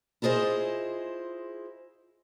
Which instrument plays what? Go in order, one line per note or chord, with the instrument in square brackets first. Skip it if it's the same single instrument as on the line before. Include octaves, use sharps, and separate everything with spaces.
[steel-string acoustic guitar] E4 F4 G#4 C5 D#5